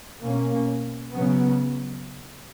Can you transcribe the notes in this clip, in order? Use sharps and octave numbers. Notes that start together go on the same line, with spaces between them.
B2 A#3 C#4
C#3 F#3 B3